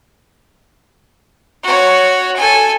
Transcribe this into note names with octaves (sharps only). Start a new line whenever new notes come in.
F#4 C#5
A4 G#5